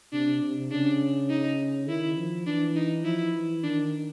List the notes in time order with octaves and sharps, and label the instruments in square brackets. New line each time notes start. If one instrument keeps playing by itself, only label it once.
[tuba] C3 [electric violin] D4
[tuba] C3
[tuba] C#3 [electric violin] D4
[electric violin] D#4
[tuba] D#3 [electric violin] E4
[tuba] F3
[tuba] E3 [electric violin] D4
[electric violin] D#4
[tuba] F3 [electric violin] E4
[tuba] E3
[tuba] D#3 [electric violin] D4